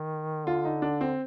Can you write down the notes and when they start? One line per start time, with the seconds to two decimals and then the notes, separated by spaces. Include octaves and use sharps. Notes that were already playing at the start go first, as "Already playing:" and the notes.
Already playing: D#3
0.47 D3 F4
0.65 D#4
0.82 D4
1.01 C4